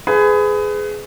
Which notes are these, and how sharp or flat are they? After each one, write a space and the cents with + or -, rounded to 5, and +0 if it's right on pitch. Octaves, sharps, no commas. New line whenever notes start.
G#4 +10 B4 +30